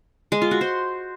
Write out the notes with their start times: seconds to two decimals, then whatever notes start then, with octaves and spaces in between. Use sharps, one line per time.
0.32 G#3
0.42 F4
0.51 F#4
0.61 C5